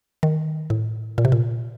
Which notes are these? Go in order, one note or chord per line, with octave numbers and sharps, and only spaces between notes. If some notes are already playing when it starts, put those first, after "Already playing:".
D#3
A2
A#2
C3
A#2